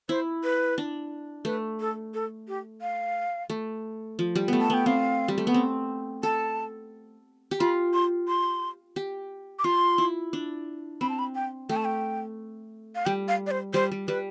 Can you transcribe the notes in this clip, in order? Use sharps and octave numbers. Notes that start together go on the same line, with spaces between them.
E4 C5
B4
D4
A3 B4
A4
A4
G4
F5
A3
F3
G3
A3 B3
A5
B3 G5
C4 F5
G3
A3
B3
C4
A4 A5
G4
F4 B5
C6
C6
G4
D6
F4 C6
E4
D4
C4 B5
A5
B5
G5
A3 G5
A5
G5
F5
G3 G5
F5
D5
C5
G3 C5
G3
G3 B4